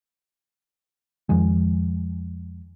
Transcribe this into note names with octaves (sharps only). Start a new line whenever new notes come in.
F2 D#3 F3 G#3